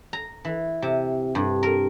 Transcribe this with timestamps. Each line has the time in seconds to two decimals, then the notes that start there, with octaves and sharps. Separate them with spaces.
0.13 A#5
0.45 E3
0.82 C3
1.35 G2
1.63 A#4